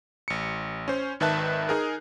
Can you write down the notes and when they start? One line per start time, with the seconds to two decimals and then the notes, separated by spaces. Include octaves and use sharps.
0.28 A1 C#7
0.88 C#4 C5
1.20 G#1 D#3 B4 E5 A5 F#6
1.69 D#4 G#4 A#4